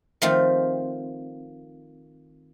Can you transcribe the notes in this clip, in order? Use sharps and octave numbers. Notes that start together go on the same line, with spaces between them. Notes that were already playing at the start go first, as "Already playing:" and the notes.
D#3 F3 A3 C4